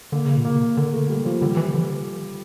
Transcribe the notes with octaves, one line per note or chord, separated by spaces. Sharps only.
D3 A#3
C#3
A#2
C#3 A#3
D3 A#3
A3
G3
F3
D3 G3
E3
D3